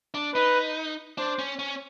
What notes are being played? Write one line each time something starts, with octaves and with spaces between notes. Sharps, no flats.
D4
D#4 B4
D4 C5
C#4
C#4